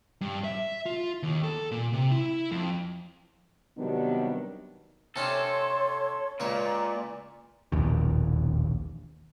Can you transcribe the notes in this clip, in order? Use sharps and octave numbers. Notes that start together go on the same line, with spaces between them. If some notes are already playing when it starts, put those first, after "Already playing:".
G2
E5
F4
D#2
A4
A#2
C3
E4
F2
C3 D#3 F#3 G3 B3 D4
C3 C#4 D4 A4 C#5 C6
C#2 A#2 C#5 D5 A#5
E1 A#1 D#2